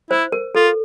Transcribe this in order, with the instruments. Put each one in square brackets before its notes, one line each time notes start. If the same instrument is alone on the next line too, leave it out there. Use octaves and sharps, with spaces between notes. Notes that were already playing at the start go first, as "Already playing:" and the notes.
[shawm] E4 [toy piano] C5
[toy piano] A#4
[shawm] F4 [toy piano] A4